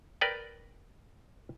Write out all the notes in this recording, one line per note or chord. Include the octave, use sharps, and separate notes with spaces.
A#4 B4 D5 G5